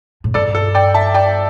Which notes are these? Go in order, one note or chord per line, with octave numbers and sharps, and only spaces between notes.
A2
G2 A4 D5
A4
D5 G5
E5 A5
D5 G5